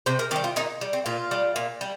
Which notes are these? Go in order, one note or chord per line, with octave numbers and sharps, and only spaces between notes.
C3 C5
A#4
D#3 G3 G4
F4
A#2 D#4
G3
C4
A#2 F4
G3
A#2
G3